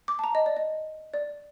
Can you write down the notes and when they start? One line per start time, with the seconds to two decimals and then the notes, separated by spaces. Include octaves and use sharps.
0.08 D6
0.19 A5
0.24 A#5
0.35 D#5
0.46 D5
0.57 D#5
1.14 D5